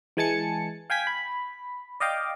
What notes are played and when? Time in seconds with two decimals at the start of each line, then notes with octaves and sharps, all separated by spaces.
0.17 E3 G#3 G#5 A5 A6 C#7
0.90 F5 G5 G#5 G#6 B6
1.07 B5
2.00 D5 D#5 F5 G5 D6